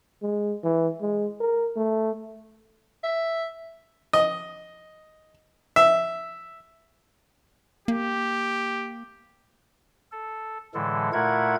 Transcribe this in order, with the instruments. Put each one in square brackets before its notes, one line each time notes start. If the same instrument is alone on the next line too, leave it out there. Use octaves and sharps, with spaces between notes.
[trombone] G#3
E3
G#3
A#4
A3
[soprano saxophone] E5
[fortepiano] D#5
E5
[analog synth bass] A#3 [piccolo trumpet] G4
[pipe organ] A4
A2 D3 E3 G#3 A4
A#2 A3 E4 A#4 F#5 G#6